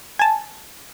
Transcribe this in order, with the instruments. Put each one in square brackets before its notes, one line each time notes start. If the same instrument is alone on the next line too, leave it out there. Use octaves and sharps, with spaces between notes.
[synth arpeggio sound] G#5 A5